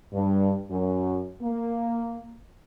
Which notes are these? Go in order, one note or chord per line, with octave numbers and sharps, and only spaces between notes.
G2
F#2
A#3